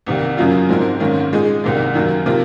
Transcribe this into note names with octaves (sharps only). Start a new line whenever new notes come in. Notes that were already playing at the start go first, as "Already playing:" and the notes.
C2 C3 D#3 A#3
F#2 C#3 F#3 A#3 F4
G#2 F3 C4 D#4 A#4
G#2 D#3 A#3 C#4
A#2 G#3 D#4 G#4
C2 C3 D#3 A#3 D#4
F#2 D#3 A#3
C3 F3 A#3 F4